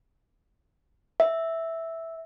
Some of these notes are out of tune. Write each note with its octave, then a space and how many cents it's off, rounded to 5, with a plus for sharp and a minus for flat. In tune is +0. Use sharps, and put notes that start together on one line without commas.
E5 -5